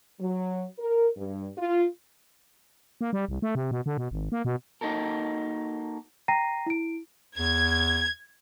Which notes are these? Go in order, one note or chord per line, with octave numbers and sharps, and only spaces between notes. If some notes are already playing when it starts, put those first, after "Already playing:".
F#3
A#4
G2
F4
A#3
G3
C2
A3
C3
B2
D3
B2
G#1
A#3
B2
A#3 D#4 F#4 A4 A#4
G5 A#5 A#6 C7 D#7
E4 D7
E2 G#6